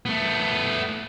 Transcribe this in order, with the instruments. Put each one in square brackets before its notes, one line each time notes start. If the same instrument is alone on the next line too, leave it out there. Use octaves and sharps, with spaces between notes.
[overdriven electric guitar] A3 B3